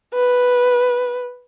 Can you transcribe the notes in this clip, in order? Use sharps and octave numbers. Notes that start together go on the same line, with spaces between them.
B4